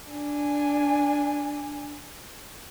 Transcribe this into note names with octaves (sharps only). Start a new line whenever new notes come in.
D4 G#5